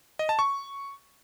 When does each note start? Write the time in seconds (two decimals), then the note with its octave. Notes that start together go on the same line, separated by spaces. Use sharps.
0.19 D#5
0.29 A5
0.39 C#6